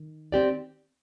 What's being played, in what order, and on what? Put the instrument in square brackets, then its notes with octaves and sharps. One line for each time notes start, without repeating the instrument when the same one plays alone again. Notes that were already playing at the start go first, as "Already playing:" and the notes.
Already playing: [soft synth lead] D#3
[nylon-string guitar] C4 G4 D5